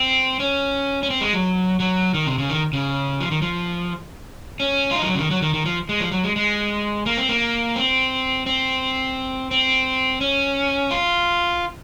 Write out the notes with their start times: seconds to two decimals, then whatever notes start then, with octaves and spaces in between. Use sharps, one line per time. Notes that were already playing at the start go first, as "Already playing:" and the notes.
Already playing: C4
0.40 C#4
1.03 C#4
1.10 C4
1.21 G#3
1.33 F#3
1.80 F#3
2.14 D#3
2.27 C3
2.38 C#3
2.50 D#3
2.73 C#3
3.21 F3
3.31 D#3
3.42 F3
4.60 C#4
4.91 F4
4.95 D#4
5.02 F3
5.07 F#3
5.15 C#3
5.19 D#3
5.31 F#3
5.42 D#3
5.54 D#3
5.66 F3
5.89 G#3
6.00 F3
6.12 F#3
6.24 G#3
6.36 G#3
7.06 A#3
7.17 C4
7.29 A#3
7.76 C4
8.46 C4
9.51 C4
10.21 C#4
10.91 F4